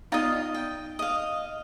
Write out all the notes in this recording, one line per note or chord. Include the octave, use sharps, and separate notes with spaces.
B3 D#4 F4 D5 D#5
G5
D#5 F5